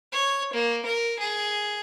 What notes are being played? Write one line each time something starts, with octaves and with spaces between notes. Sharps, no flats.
C#5
A#3
A#4
G#4